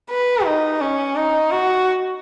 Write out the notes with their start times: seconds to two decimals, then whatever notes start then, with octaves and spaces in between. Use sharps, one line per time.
0.10 B4
0.45 D#4
0.81 C#4
1.16 D#4
1.51 F#4